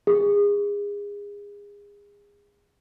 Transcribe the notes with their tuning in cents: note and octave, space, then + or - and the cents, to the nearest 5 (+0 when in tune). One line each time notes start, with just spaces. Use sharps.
G#4 -30